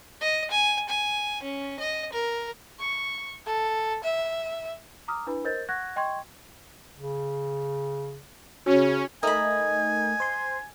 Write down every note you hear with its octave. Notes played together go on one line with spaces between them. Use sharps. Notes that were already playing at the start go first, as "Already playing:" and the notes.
D#5
G#5
G#5
C#4
D#5
A#4
C#6
A4
E5
A#5 D6 D#6 F6
D4 E4 B4 B5
A#4 C5 D#5 G6 A6
F#5 C#6 F#6 G#6 A#6
D#5 G5 C6 C#6 G#6
C#3
C#3 C#4 F#4 C#5
A3 D#4 A#4 D#5 G#5 B5
C5 C6